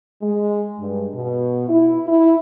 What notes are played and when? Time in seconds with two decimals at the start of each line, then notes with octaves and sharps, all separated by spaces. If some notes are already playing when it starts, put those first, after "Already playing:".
0.22 G#3
0.79 G2
1.14 B2
1.68 E4
2.07 E4